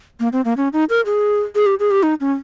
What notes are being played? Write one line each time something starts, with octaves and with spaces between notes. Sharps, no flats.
A#3
C4
A#3
C#4
D#4
A#4
G#4
G#4
G4
G#4
G4
D#4
C#4